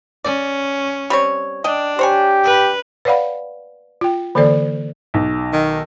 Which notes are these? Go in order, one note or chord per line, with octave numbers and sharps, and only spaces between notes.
C#4 D5
G3 C4 C#5
D4 D#5 G5
G4 C5 C#5 G#5
B4
B4 C#5 D5 F5 F#5 B5
F4 G5
D3 E3 A#3 A4 C5 D5
B1
D#3